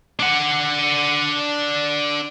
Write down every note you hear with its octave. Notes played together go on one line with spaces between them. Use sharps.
D4 F#5